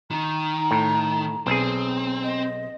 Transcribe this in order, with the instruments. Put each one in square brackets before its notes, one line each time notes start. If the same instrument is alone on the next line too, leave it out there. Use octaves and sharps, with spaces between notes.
[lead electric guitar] D#3 [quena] A#5
[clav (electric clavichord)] A2
[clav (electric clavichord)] B1 G#4 [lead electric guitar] C4
[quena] D#5